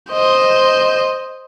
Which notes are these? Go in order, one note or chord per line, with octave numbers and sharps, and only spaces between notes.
C5 D#5